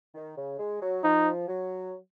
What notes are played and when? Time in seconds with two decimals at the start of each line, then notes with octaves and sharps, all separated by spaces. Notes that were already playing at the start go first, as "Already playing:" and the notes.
0.15 D#3
0.37 C#3
0.59 G#3
0.82 F#3
1.04 F3 D#4
1.48 F#3